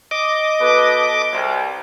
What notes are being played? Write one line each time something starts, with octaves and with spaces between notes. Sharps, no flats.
D#5 D6
B2 A4 B4
C2